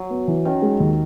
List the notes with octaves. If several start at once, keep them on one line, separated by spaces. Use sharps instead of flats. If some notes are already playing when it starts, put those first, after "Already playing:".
Already playing: F#3
B3
E3
D#3 C#4
G#3
D#2